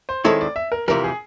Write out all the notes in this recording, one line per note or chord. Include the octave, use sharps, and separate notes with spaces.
C5
D#3 G#3 C4 E4 A4 C#5
D5
E5
A#4
F2 C3 E3 G3 A#4
G#4